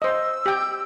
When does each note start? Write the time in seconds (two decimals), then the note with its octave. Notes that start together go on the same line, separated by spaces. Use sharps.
0.02 C5 D#5 E6
0.46 G4 G5